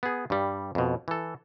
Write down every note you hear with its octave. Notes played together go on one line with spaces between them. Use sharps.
B3 G#4
G2 G3
F2 B2
E3 A4